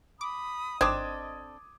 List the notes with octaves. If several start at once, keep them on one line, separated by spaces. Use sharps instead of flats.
B5 D6 D#6
G#1 C4 D4 A4 D#5 D6 D#6 G#6